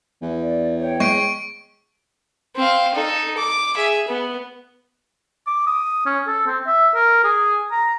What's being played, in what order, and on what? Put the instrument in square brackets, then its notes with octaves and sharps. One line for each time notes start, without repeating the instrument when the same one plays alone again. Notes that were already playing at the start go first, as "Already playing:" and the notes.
[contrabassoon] E2
[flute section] D5
C#5 G5
[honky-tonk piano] G#3 [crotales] C#6 D7
[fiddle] C4 F5
D#4 A4
D6
G#4 E5
B3
[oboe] D6
D#6
C#4
A4
C4
E5
A#4
G#4
A#5